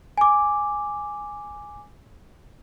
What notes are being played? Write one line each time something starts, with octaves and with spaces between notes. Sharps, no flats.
G#5 D6